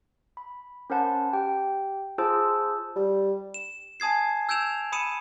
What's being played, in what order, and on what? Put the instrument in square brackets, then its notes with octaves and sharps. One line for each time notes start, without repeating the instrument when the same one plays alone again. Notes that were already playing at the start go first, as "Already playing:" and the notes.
[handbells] B5
C#4 A#4 C5 F#5 A5 B5
G4 G5
F4 G#4 C5 A5 E6
[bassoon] G3
[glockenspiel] E7
G#5 A5 D#6 G#6 C7
E6 G6 G#6 D7 E7 F7
B5 D#6 C#7 D#7 E7